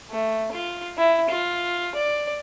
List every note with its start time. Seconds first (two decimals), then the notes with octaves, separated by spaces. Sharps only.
0.10 A3
0.52 F4
0.97 E4
1.29 F4
1.95 D5